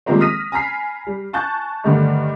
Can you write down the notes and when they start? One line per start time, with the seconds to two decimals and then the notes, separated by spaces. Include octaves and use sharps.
0.06 D#3 F3 G3 G#3 A#3 C4
0.20 D#6 F6 A#6 B6 D#7
0.52 G#5 A#5 B5 F6 B6 C7
1.07 G3
1.33 G#5 A5 C#6 F#6 G6 A6
1.84 G2 D3 D#3 G3 A3 D#4